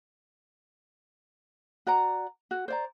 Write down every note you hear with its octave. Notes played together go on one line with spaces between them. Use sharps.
F#4 D5 F#5 A#5
F#4
C5 D5 A#5